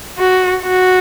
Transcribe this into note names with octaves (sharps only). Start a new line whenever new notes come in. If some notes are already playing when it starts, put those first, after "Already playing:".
F#4
F#4